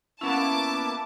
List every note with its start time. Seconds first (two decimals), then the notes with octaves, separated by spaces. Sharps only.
0.21 A#3 B3 C#4 E4 A5 D6